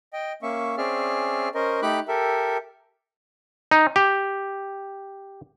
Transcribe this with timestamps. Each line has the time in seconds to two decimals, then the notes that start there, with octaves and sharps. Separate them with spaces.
0.13 D#5 G5
0.43 A#3 C#4 E5 C#6
0.78 C4 C#4 G#4 D5 E5 F6
1.55 C#4 A#4 C5 D#5
1.82 A3 D#4 G4 B5 D6 F#6
2.08 G4 A4 A#4 E5
3.71 D#4
3.96 G4